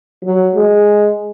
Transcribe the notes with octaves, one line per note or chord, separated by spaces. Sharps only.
F#3
G#3